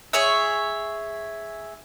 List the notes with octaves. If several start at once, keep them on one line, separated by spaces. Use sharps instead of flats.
G#4 C#5 E5